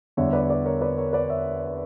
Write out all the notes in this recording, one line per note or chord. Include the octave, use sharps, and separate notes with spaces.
E2 D3 G3 C#5 E5
B4 D5
B4 D5
A#4 C#5
B4 D5
A#4 C#5
B4 D5
C#5 E5